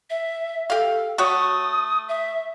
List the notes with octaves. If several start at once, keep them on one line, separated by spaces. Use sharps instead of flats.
E5
G4 A4 F5
A3 F#4 C#5 D#6
E5